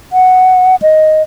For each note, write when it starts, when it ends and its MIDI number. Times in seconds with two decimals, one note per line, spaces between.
0.13 0.76 78
0.82 1.22 75